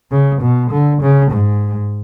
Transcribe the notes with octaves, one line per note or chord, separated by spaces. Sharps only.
C#3
B2
D3
C#3
G#2